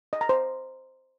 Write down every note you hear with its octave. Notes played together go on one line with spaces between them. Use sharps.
D#5
A#5
C5